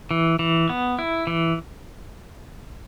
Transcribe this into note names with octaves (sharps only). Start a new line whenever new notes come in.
E3
E3
B3
E4
E3